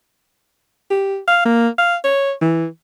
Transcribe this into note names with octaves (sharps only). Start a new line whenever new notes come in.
G4
F5
A#3
F5
C#5
E3